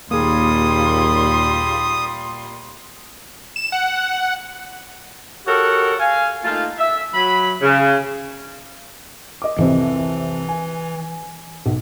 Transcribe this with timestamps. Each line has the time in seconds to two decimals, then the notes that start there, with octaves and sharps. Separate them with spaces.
0.11 D#2 A#2 G3 A#3 G#4 C6 D#6
3.56 E7
3.72 F#5
5.46 F#4 G4 A4 A#4 C#5 F#5
5.99 F5 G#5
6.44 A3 A#3 D#4 F4
6.78 E5
7.14 F#3 B5
7.62 C#3
9.42 D#5 D6
9.59 C2 F2 C3 E3
10.49 G#5
11.66 B1